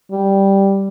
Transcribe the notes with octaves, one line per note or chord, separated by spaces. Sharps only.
G3